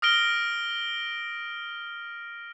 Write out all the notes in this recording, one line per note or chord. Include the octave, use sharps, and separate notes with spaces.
D#6 F6 A#6 D7 G7